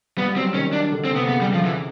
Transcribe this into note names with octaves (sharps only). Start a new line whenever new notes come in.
G3 B3
F#3 C4
D#3 C#4
D4
D3
C4
C3
B3
C#3 B3
G3
D3
F3
E3